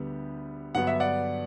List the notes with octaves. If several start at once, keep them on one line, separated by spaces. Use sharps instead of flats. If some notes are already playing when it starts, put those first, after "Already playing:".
Already playing: D2 D3 G3 B3
G2 D3 F#3 B3 F#5
E5
D5 F#5